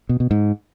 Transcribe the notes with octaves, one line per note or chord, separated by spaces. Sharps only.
B2
B2
G#2